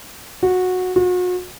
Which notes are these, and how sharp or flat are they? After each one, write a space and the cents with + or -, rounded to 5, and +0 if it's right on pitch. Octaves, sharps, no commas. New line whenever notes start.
F#4 -15
F#4 -40